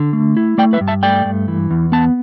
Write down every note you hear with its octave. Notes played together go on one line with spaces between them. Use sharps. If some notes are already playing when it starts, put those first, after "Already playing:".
Already playing: D3
A3
E4
A3 D5 G5
B4 E5
G2
E5 A5
A3 D5 G5
G2
E3
E2
B3 A5